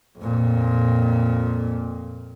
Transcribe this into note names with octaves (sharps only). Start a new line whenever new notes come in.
F2 A#2